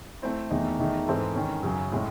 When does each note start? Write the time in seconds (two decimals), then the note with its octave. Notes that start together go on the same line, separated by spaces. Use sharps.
0.22 A3 C4 E4
0.50 E2 D#3 A3 D#4
0.79 E2 D#3 A3 D#4
1.07 G#2 E3 C4 E4 A4
1.35 D#3 G#3 C#4
1.63 F#2 C#3 F#3 C#4 G#4
1.92 A2 G#3 C#4